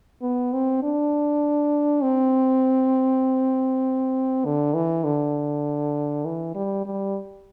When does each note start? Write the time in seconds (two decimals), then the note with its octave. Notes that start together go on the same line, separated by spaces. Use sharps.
0.22 B3
0.53 C4
0.83 D4
2.03 C4
4.45 D3
4.74 E3
5.04 D3
6.25 E3
6.55 G3
6.86 G3